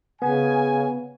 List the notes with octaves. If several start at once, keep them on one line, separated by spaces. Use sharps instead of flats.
C#3 B3 G#5